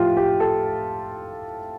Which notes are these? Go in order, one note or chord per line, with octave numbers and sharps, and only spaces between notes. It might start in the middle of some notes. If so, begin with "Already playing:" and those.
Already playing: A2 F3 F4 G4
G4
A4